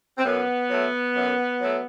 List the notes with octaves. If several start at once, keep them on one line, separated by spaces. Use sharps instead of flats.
C4
F#2 B3
F#3 A3
F#2
F#3 A3